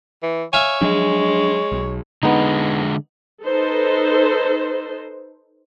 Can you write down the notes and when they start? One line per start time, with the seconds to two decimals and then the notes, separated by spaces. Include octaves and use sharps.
0.23 E3
0.53 C#5 E5 F5 G#5
0.82 F3 F#3 G#3 D4
1.72 B1
2.23 D3 G#3 B3 D#4
3.43 D#4 A4 B4 C5